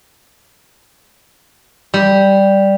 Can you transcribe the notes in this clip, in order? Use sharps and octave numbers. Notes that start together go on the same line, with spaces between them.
G3